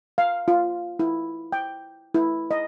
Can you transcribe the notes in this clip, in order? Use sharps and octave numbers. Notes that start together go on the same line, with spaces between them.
F5
F4
E4
G5
E4
D#5